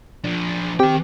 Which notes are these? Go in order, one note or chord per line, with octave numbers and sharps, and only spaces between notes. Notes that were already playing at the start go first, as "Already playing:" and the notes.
F3 D4
D#3 C4 G4 G5